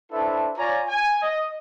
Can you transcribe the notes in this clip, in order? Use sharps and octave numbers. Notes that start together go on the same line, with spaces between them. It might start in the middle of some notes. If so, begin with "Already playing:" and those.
D4 E4 A4 B4 C5 E5
F4 C#5 D5 G#5 A#5
G#5
D#5